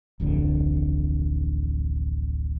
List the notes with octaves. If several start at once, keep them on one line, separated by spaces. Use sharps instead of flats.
D1 A1 F2 D3